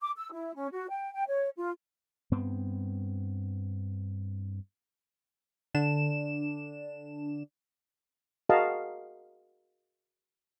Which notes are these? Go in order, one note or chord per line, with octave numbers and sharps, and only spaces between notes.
D6
E6
E4
C#4
F#4
G5
G5
C#5
F4
G2 B3 C4
D3 D4 E7
F#4 G#4 A#4 D#5 F5 A5